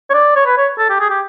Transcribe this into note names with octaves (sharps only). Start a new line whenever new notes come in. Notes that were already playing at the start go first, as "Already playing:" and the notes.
C#5
D5
C#5
B4
C#5
A4
G4
G#4
G4